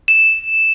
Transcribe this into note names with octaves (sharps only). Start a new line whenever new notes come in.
E7